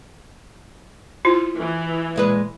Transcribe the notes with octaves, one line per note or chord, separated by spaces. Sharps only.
E4 F4 C5
E3
A#2 G#3 B4